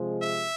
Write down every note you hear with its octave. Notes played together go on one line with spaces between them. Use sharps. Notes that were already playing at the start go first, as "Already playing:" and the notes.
Already playing: C3 F3 G#3
E5